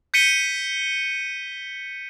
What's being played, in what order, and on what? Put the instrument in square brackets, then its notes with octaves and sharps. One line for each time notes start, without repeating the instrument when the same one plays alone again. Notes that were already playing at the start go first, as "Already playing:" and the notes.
[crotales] G6 B6 C#7 D#7 G7